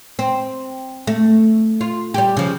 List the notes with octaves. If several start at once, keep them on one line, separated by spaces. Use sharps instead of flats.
C4
A3
F4
G3 G4
C#3 F3